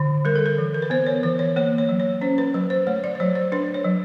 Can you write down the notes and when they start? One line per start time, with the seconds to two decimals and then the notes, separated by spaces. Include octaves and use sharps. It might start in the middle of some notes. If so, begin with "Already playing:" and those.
Already playing: D3
0.25 G3 A#4
0.36 A4
0.46 A#4
0.58 E3
0.74 A#4
0.82 B4
0.90 B3 C5
1.06 C#5
1.23 E3 C5
1.39 C#5
1.56 A#3 C#5
1.78 C#5
1.89 F#3
2.00 C#5
2.21 C#4 C5
2.38 B4
2.54 F#3 B4
2.70 C5
2.87 A3 C#5
3.04 D5
3.15 C5
3.20 F#3 C#5
3.35 C5
3.52 D4 B4
3.74 C#5
3.85 F#3